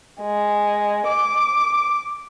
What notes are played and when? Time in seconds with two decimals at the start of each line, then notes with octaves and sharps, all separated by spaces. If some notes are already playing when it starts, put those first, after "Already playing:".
0.21 G#3
1.07 D6